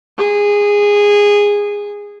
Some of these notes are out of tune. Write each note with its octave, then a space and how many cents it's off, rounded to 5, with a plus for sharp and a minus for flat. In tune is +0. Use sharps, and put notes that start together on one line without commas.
G#4 -15